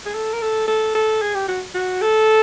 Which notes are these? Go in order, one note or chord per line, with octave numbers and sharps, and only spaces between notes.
G#4
A4
A#4
A4
A4
A4
G#4
G4
F#4
F#4
A4